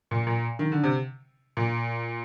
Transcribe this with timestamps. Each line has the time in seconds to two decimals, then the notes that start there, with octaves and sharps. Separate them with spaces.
0.11 A#2
0.27 A#2
0.59 D#3
0.72 D3
0.83 C3
1.57 A#2